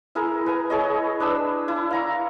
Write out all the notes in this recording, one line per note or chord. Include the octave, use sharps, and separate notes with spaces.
E4 G#4 A#4
B4 G#5 A#5
E4 G#4 C#5 D#5
D4 B4 E6
E4
F5 A#5 C#6